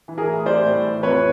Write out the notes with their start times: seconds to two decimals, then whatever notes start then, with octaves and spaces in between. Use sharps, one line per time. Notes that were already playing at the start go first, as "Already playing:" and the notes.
0.08 E3
0.18 G#4 A#4
0.27 A2
0.46 G3 C5 D5
0.66 A2
0.84 E3
1.03 F2 B4 C#5